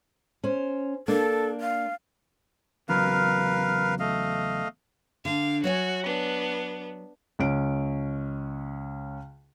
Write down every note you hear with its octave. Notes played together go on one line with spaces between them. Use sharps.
C#4 C5
A#3 D4 A4
F5
E2 C#3 F#3 A#4 B4 F5
A3 D#5 F5
D3 D4 F5
F#3 F#4 C#5 G#5
B3 D4
C#2 C#4 D7